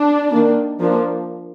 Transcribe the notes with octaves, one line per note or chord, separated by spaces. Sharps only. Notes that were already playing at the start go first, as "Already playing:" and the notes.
Already playing: D4
D#3 A#3 D4
F3 A#3 D4